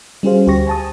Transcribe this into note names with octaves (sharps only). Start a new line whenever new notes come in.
G3 C#4 F#4 G#4 C5 F5
D2 G4 C5 C#6 A#6
G#5 A5 D#6